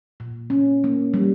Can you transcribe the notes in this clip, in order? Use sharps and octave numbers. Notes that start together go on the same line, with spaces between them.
A#2
C#4
A#3
G3